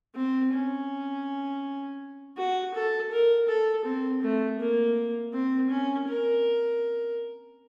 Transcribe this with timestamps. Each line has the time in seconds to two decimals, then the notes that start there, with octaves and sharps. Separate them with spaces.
0.15 C4
0.52 C#4
2.37 F#4
2.74 A4
3.12 A#4
3.48 A4
3.85 C4
4.22 A3
4.59 A#3
5.33 C4
5.70 C#4
6.07 A#4